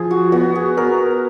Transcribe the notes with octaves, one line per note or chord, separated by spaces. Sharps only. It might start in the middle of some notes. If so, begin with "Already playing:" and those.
Already playing: F3 G#4
F#4
B3 F#4
G#4
B3 A#4